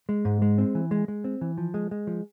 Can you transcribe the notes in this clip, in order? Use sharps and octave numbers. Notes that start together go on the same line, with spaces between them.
G#3
G#2
G#3
C4
E3
G#3
G#3
C4
E3
F3
G#3
G#3
F3